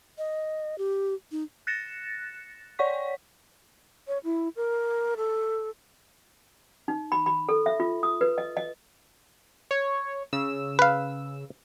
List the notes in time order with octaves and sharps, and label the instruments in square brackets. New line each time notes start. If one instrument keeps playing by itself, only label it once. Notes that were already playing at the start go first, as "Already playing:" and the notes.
[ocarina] D#5
G4
D#4
[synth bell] F#6 A6 A#6 C#7 E7
C#5 D5 F#5 C#6 B6
[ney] C#5
E4
A#4
A4
[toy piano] D#4
B5
B5
A4
E5
F4
D#6
B4
D#5
D#5
[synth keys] C#5
C#3 E6
[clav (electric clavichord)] B4 F5